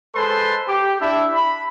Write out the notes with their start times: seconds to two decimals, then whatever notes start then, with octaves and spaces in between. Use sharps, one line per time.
0.14 G#3 A4 B4 C5 A5 C6
0.68 G4
1.00 D4 E4 E5
1.34 B5